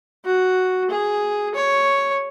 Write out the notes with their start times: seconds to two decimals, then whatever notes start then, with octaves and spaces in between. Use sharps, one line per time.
0.25 F#4
0.90 G#4
1.54 C#5